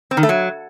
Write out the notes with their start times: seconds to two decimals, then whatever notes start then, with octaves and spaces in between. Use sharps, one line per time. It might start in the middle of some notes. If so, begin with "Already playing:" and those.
0.11 C4
0.17 D#3
0.23 A3
0.29 F#3